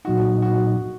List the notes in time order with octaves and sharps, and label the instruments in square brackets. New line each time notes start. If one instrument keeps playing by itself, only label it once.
[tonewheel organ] A#2 F#3 D#4 [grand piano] F#4
[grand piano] F#4